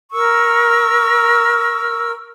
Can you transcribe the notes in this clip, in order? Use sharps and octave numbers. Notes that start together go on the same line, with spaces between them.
A#4 C#6 E6